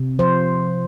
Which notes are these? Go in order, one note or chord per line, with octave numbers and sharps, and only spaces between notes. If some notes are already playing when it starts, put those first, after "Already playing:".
Already playing: C3
F3 C5